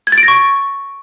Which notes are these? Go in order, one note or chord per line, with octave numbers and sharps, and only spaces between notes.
G#6
A6
D7
A#6
C#6